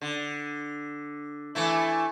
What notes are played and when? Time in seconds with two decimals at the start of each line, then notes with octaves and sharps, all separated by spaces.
0.01 D3
1.55 E3 A3 E4